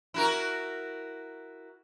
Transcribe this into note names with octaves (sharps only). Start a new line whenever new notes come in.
E4 F#4 A#4